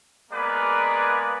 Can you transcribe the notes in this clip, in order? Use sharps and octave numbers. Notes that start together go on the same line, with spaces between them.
G#3 A#3 B3 A#4 B4 D5